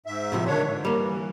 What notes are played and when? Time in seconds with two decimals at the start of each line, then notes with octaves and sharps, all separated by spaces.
0.06 G#2 E5
0.32 A2 C3 F3
0.47 D3 D#3 D4 C#5
0.67 G#2
0.85 G3 A#3
0.98 E3